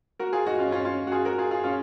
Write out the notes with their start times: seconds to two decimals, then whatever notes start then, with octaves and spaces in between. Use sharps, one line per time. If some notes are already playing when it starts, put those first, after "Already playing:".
0.19 F#4 A#4
0.33 F4 G#4
0.46 D#4 F#4
0.59 C#4 F4
0.72 C#4 F4
0.85 C#4 F4
1.07 F#4
1.12 F4 G#4
1.25 F#4 A#4
1.38 F4 G#4
1.51 F4 G#4
1.64 C#4 F4